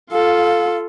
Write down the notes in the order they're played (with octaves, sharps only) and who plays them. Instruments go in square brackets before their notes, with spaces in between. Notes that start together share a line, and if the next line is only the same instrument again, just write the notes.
[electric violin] F4 A4 [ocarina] F5